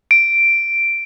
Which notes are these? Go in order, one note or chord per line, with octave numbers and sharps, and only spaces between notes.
D7